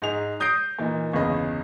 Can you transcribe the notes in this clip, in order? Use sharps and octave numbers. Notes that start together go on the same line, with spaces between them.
G#2 D#4 G#4 F7
D#6 G6 A#6 C7 D7
A#2 E3 A#3 D#4
G1 E2 C#3 G#4 D#5 B5